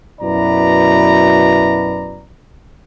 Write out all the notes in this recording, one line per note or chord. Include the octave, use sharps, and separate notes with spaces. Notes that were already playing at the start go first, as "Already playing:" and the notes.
F#2 B2 E4 B4 D5 A#5